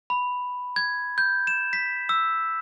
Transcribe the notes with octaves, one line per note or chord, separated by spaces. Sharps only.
B5
G#6
G6
E7
B6
E6